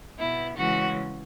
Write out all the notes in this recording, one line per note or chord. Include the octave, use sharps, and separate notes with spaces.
B2 B3 E4
C#3 E3 G#3 C#4 F#4